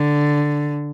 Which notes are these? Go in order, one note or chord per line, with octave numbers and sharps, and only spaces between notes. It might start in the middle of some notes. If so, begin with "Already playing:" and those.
Already playing: D3